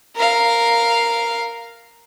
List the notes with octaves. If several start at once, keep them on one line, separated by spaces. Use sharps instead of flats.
A#4 F5